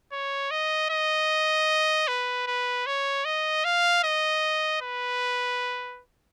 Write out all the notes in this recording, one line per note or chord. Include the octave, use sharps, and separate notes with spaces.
C#5
D#5
D#5
B4
B4
C#5
D#5
F5
D#5
B4